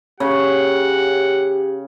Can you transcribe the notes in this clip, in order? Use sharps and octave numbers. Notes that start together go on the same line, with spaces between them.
C#3 G4 F#5